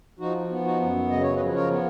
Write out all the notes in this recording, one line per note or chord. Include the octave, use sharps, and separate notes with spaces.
F3 D#4 F#4
B3
D#4 F#4
F#2
C#3 D#5
C#5
B4 D#5
F3
A#4 C#5
B3